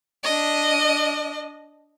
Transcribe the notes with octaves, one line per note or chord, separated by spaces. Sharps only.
D4 D#5